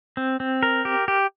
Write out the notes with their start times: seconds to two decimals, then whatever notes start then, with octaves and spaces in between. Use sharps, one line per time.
0.17 C4
0.40 C4
0.63 A#4
0.85 G4
1.08 G4